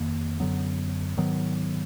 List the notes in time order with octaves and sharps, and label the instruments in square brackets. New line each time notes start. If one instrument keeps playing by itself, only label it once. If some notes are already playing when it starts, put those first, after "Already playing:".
Already playing: [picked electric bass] F2 D#3 A#3
F#2 D3 F#3 B3
G#2 D#3 F#3 B3